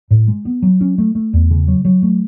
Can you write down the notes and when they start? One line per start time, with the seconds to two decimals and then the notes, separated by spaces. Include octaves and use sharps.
0.11 A2
0.27 G#3
0.45 B3
0.62 F#3
0.81 C#4
0.98 A3
1.15 A3
1.33 E2
1.51 C#3
1.68 F#3
1.85 F#3
2.02 A3